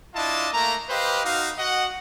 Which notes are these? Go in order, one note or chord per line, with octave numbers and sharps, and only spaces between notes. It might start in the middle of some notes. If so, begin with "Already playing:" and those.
D4 E4 F4 D#5 A5
A3 A#3 A#5
G4 B4 C5 D#5 F5
D#4 F#4 F5
F#4 D#5 F#5